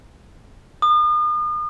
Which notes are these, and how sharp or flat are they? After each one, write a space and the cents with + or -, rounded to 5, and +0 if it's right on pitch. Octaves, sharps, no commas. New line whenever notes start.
D#6 -40